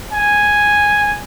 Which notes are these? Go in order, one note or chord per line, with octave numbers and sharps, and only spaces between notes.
G#5